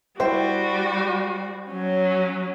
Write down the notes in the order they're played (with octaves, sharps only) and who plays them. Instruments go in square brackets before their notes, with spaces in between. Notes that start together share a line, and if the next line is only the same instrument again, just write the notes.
[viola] G3 F#4 [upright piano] E4 C5 G5
[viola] F#3 C#4